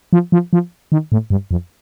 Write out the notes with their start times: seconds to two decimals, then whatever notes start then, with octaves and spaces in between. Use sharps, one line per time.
0.13 F3
0.32 F3
0.53 F3
0.92 D#3
1.12 A2
1.30 G2
1.51 F2